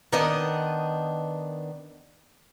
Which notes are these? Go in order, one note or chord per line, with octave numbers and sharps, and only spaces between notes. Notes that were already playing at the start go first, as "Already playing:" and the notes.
D#3 B3 D4 D#5